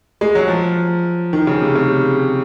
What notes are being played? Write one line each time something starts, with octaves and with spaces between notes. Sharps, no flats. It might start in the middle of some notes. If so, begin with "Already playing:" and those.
G#3
F#3
F3
D#3
C#3
C3
C#3